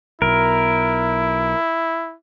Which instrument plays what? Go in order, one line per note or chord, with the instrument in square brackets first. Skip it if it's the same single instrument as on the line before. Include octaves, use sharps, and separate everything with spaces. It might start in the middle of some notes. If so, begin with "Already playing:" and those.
[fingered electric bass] B1 B2 [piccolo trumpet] E4 [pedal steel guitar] A#4